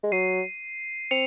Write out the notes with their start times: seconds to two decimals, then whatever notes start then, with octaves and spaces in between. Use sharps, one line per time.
0.04 G#3
0.12 F#3 C7 D#7
1.11 C4 C#7 F7